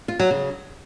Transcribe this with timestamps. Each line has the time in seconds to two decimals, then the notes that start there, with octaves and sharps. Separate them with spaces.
0.08 F4
0.20 F#3
0.31 C#3